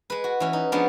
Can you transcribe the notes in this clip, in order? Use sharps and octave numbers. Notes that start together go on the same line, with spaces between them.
G#3 B4
F#4
E3 C#4
D#4
F3 G#3 B3 C#4 D4